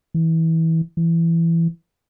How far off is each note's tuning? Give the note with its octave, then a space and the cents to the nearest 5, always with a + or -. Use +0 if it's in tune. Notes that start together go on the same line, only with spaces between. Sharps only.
E3 -25
E3 +15